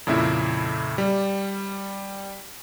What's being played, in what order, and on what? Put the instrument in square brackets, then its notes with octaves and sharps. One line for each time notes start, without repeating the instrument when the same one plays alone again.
[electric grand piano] F2 A#2 C#3 E4 E5
G3